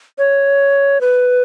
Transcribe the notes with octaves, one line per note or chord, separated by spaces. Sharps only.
C#5
B4